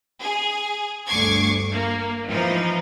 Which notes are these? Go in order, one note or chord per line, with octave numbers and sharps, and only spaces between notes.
G#4
G1 D2 C#6 D6 G#6 C7
A#3
E3 F3 D#4